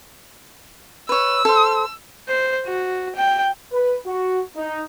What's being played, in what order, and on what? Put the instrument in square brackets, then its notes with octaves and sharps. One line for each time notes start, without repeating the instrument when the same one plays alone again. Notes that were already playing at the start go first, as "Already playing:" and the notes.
[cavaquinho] B4 C#5 [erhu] E6
[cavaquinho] A4 C5
[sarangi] C5
F#4
G5
[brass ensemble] B4
F#4
D#4